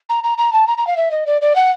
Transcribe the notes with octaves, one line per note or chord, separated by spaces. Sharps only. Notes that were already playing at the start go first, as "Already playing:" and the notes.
A#5
A#5
A#5
A5
A#5
A#5
F5
E5
D#5
D5
D5
F#5